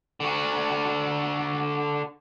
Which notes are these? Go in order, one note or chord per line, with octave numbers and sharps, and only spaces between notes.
D3 F#4